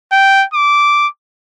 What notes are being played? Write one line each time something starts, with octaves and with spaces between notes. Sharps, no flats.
G5
D6